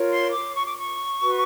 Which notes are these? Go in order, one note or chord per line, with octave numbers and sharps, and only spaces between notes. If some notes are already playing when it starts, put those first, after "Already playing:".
Already playing: F4 A#4 C#5
C6
D6
C#6
D6
C#6
F#4 B4